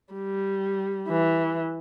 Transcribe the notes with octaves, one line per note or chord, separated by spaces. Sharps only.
G3
E3